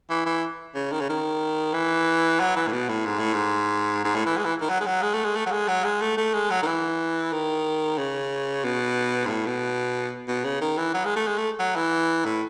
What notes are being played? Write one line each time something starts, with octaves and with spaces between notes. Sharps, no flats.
E3
E3
C#3
D#3
C#3
D#3
E3
F#3
E3
A2
B2
A2
G#2
A2
G#2
G#2
A2
E3
G#3
E3
D#3
F#3
G#3
F#3
G#3
A3
G#3
A3
F#3
G#3
F#3
G#3
A3
A3
G#3
F#3
D#3
E3
D#3
C#3
B2
G#2
A2
B2
B2
C#3
D#3
E3
F#3
G#3
A3
G#3
A3
F#3
E3
A2